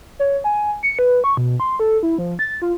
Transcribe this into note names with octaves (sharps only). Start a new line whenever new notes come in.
C#5
G#5
C#7
B4
C#6
B2
C6
A4
E4
F3
A6
F4